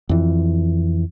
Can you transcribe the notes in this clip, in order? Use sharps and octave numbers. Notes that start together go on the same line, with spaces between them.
F2 E3